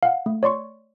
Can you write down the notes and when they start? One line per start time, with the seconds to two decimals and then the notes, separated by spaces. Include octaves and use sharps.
0.03 F5 F#5
0.26 A3
0.43 C#5 D5 C6 C#6